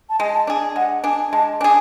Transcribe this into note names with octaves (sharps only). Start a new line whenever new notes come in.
A5
G#3 G#5
A5
D4 G#4
G#5
G#3 F#5
D4 G#4 G#5
G#3 A5
D4 G#4 G#5